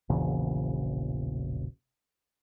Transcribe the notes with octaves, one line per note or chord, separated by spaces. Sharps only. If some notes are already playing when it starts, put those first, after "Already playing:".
E1 A#1 E2 C#3